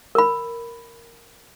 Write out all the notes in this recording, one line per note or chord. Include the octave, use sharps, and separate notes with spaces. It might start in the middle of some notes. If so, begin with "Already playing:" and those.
A#4 B5